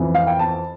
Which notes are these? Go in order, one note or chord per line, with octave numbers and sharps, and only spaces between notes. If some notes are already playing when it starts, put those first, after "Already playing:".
Already playing: F2 E3
F5
G5
A5